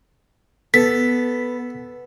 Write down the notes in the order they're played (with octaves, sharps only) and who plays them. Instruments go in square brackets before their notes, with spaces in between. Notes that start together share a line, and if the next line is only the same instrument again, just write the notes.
[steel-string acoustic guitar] B3 [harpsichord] A4 [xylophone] B6